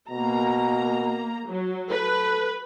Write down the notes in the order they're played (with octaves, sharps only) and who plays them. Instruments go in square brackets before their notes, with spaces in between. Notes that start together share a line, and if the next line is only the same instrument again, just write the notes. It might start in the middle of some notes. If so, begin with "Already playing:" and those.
[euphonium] B2 [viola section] A#3 A#5
[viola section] F#3
[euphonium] A4 [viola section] B4